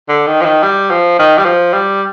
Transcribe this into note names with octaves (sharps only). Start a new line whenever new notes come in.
D3
D#3
F3
D#3
G3
F3
D#3
G3
F3
G3